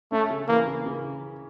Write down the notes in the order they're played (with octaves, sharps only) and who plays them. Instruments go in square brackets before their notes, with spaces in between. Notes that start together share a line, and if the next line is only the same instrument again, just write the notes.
[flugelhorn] A3 [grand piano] C#4
[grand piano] C#3
[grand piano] E3 [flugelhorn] A#3
[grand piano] C#3
C#3